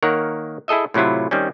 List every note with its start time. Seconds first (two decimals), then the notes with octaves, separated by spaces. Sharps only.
0.03 D#3 A#3 A#4 C#5 F#5 A#5
0.68 E4 G#4 A4 D#5 E5
0.94 A2 C3 F#3 E4 F4
1.31 D#3 G3 C4 C#4